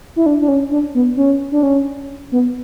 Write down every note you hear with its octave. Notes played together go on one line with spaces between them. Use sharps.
E4
D4
D4
C#4
D4
B3
C#4
D4
C#4
B3